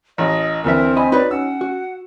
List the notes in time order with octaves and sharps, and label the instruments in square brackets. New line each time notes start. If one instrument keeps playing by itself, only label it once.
[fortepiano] A1 [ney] D#5
[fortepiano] D2 E3 E5 [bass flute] C4 [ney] A#4
[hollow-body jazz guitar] D#5 B5 [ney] G#5
[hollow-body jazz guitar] D#4 F#4 C#5 [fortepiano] B4 [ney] D5
[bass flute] C#4 [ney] F#5 [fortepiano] E6
[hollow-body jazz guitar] F#4